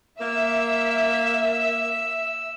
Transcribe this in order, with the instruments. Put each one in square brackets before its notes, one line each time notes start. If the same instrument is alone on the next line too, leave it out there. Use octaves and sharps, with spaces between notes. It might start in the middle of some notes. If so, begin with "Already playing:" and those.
[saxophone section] A#3 [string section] E5 [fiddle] E6